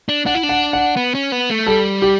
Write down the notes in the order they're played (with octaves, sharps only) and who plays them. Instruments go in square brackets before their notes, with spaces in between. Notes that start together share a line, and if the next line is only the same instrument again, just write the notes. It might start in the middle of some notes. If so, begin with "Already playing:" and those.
[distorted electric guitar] D4
[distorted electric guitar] D4 [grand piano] F#5
[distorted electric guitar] E4
D4
[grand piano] F#5
F#5
[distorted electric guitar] B3
C#4
B3
A3
[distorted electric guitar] G3 [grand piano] A4
[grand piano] G4